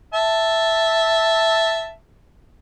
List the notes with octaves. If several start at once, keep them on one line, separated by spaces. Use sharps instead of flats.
E5 A5